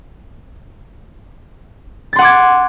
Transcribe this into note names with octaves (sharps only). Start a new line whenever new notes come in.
F#5 C6 D6 G#6 A6